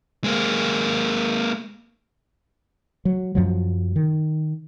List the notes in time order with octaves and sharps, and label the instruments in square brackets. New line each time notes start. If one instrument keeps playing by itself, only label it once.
[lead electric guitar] G#3 A#3
[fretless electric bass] F#3
F#2 F3 F#3
D#3